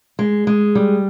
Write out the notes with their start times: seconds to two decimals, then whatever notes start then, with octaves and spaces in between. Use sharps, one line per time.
0.19 G#3
0.47 G#3
0.75 G3